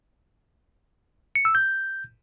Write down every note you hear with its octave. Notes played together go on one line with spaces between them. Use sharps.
C#7
E6
G6